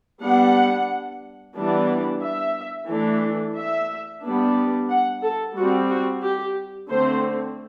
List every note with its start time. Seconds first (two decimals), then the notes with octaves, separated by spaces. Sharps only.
0.23 G3 B3 D4 F#5
1.56 E3 G3 B3 D4
2.23 E5
2.89 E3 A3 D4
3.57 E5
4.24 G3 B3 D4
4.90 F#5
5.23 A4
5.56 G3 C4 F#4
5.90 F#4
6.23 G4
6.90 D3 A3 C4 C5